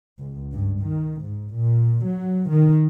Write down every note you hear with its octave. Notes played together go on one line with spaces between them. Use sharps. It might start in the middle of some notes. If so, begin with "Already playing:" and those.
C#2
G2
D#3
G#2
A#2
F#3
D#3